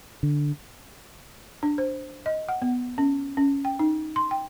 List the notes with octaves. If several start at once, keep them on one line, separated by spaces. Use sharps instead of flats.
D3
D4
C5
D#5
F#5
B3
C#4
C#4
G5
D#4
C6
G5